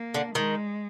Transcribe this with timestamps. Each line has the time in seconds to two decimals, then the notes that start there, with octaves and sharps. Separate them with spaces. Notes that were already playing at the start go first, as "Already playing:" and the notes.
Already playing: A#3
0.14 D3
0.35 D#3 G#3